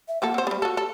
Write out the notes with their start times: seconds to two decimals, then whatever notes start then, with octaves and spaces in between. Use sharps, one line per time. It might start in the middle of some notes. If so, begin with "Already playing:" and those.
0.08 E5
0.22 F3 A#3 A4 F#5
0.34 C4 C5
0.47 G3 B3 G4
0.62 F#4 A4
0.77 A4